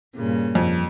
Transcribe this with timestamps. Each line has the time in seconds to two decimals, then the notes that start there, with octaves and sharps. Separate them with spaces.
0.15 G2 A#2 C#3
0.55 F2